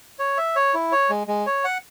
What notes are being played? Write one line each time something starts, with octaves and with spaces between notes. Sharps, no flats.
C#5
E5
C#5
E4
C#5
G#3
G#3
C#5
F#5